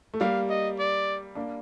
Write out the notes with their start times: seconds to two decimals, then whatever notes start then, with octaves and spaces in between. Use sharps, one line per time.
0.14 A3
0.21 G3 A#3 F5
0.49 D#5
0.79 D5
1.35 A#3 D4